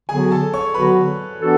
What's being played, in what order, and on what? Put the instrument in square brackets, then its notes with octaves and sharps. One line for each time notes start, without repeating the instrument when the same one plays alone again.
[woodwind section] D3 F#3 B3 F#4 [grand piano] G#4 G#5
[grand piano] A4 A5
C#5 C#6
[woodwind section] D3 F#3 B3 F#4 [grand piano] B4 B5
[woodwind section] E3 B3 D4 F#4 A4